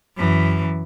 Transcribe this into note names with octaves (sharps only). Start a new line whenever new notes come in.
F#2 E3